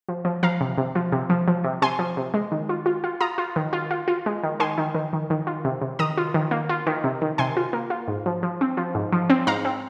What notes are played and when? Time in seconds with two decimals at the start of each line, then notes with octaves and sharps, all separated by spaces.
0.09 F3
0.25 F3
0.43 F3 F5 A#5
0.61 C3
0.78 C3
0.95 F3
1.12 C3
1.30 F3
1.48 F3
1.64 C3
1.82 C3 G#5 C6
1.99 F3
2.17 C3
2.34 G#3
2.52 D#3
2.69 F4
2.86 F4
3.04 F4
3.21 F4 A#5 D#6
3.38 F4
3.56 D#3
3.73 F4
3.91 F4
4.08 F4
4.26 G#3
4.43 D#3
4.60 D#3 G#5 C6
4.78 D#3
4.95 D#3
5.13 D#3
5.30 D#3
5.47 F4
5.65 C3
5.82 C3
5.99 D#3 A#5 D#6
6.17 F4
6.34 D#3
6.51 A#3
6.69 F4
6.87 D#3
7.04 C3
7.22 D#3
7.38 C3 G#5 C6
7.57 F4
7.73 A#3
7.90 F4
8.08 G#2
8.26 F3
8.43 F3
8.61 C4
8.77 F3
8.95 G#2
9.12 F3
9.30 C4
9.47 G#2 F5 A#5
9.65 C4